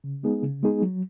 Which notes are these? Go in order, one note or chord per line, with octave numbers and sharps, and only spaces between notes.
C#3
G#3 B3 D#4 G#4
C#3
G#3 B3 D#4 G#4
F#3